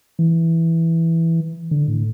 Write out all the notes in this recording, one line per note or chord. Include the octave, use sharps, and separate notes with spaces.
E3
D3
A2